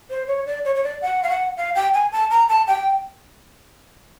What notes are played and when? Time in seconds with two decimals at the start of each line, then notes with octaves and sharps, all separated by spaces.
0.10 C5
0.28 C#5
0.46 D5
0.65 C#5
0.75 C#5
0.84 D5
1.02 F#5
1.23 F5
1.29 F#5
1.57 F5
1.75 G5
1.94 G#5
2.12 A5
2.31 A#5
2.49 A5
2.68 G5